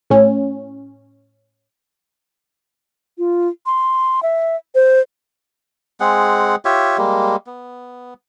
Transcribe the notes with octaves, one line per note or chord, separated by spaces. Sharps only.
A2 C#4
F4
C6
E5
C5
G#3 C4 G#4 F#5
F4 G4 C#5 E5
G3 G#3 A#3
B3